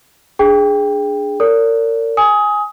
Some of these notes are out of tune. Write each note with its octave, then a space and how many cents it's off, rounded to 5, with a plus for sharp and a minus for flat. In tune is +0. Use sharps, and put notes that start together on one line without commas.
D4 +0 G#4 +0 G5 +15
A#4 -35 D5 -40
G#5 +0 D#6 +25